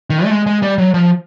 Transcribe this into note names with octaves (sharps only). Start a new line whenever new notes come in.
D#3
A3
G#3
G#3
G3
F#3
F3